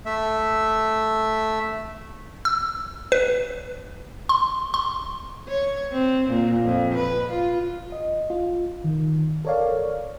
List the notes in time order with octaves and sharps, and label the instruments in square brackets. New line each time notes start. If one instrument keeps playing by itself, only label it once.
[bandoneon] A3 E5
[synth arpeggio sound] E6
B4
C6
C6
[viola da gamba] C#5
C4
A#2
F2
B4
F4
[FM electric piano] D#5
F4
D#3
A4 A#4 C#5 D5 F5